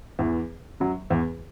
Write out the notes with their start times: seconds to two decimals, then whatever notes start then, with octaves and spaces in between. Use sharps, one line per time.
0.19 E2 E3
0.80 F#2 F#3
1.10 E2 E3